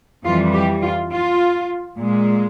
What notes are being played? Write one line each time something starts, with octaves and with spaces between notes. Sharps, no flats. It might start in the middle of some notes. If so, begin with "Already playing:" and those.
F2 E3 G3 F4
G4
F4
F4
A#2 G#3